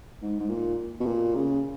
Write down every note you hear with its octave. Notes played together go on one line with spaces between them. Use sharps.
G#2
G#2
A#2
B2
A#2
C#3